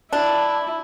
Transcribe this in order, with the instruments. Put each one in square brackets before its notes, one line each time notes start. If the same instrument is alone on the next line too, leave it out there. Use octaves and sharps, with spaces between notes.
[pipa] D4 [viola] E4